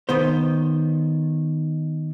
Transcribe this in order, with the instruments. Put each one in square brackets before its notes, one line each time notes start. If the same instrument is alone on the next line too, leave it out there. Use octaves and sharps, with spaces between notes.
[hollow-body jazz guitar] D#3 B3 C5